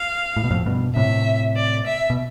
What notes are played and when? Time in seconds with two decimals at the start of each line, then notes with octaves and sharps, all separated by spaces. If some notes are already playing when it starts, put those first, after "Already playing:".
Already playing: F5
0.36 A2
0.44 B2
0.51 F2 A2
0.66 G2 B2
0.96 A2 C3 E5
1.56 D5
1.86 E5
2.10 B2